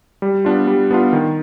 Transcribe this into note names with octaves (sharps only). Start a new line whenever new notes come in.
G3
B3 D4 F4
G3
B3 D4 F4
D#3